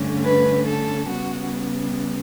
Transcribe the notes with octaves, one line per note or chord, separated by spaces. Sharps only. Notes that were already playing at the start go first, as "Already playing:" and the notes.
Already playing: G2 D3 A3 C#4
B4
A4
C#3 G3 B3 F#4